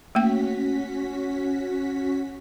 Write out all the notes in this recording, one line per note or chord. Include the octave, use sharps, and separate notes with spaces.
A3 A#3 C#4 F#4 G5 B6